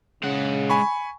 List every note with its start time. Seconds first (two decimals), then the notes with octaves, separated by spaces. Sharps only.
0.23 C#3 G#3 F#5
0.70 G#5 B5 C#6